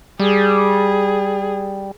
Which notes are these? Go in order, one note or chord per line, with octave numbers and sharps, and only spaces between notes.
G3 G#4